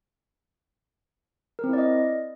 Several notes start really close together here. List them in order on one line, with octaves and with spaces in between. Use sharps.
A#4 C4 E4 D5 D#5